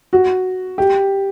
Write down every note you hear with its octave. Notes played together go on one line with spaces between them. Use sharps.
F#4
G4